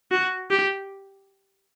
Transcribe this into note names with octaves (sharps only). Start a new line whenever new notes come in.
F#4
G4